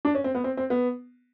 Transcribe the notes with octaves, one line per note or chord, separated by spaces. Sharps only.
D4
C#4
C4
B3
C4
C4
B3